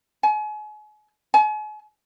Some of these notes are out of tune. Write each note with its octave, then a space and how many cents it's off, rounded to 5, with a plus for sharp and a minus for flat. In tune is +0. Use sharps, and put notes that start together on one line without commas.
G#5 +35
G#5 +40